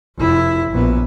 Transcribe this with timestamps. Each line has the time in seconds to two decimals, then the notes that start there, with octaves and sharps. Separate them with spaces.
0.18 F1 E4
0.71 A#1 B3